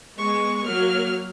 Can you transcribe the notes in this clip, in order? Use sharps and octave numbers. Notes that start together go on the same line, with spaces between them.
G#3 B3 C#6
F#3 A#3 F6